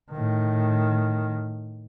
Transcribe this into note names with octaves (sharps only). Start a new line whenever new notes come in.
A2 D#3